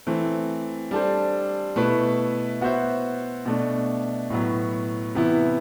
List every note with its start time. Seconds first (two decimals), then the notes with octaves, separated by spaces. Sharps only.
0.07 E3 A3 C4
0.91 G3 D4 A4 C5
1.76 B2 A3 E4 B4 E5
2.61 B3 F#4 C5 E5
3.46 B2 A3 D4
4.30 A2 F#3 B3
5.15 C3 E3 B3 E4